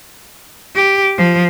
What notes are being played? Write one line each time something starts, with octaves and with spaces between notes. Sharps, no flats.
G4
F3